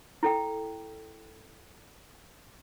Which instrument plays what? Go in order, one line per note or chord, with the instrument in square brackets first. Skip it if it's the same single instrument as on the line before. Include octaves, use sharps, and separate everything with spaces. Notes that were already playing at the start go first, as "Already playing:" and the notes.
[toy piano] E4 A4 G5